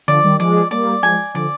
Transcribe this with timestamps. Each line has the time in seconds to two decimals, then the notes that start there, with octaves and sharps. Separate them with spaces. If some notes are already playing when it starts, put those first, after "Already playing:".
0.08 D3 F3 D5
0.24 D#3 G3
0.40 F3 G#3 D5
0.71 G3 A#3 D5
1.03 F3 G#3 G#5
1.35 D3 F3 D5